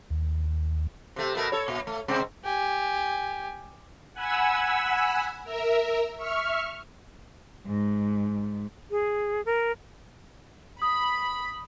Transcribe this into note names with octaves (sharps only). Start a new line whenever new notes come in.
D#2
C3 A3
B2 A3 A#4
A4 C#5
A#2
A3
C3 G#3 C4
G4 G#5
F#5 G#5 B5 E6
A#4 E5
E5 C#6 F6
G#2
G#4
A#4
B5 D#6